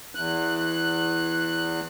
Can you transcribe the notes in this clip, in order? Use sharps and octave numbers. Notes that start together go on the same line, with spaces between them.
E2 F#6